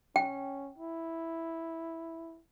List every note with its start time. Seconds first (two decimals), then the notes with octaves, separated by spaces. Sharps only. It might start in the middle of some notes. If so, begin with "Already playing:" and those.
0.16 C#4 G5
0.78 E4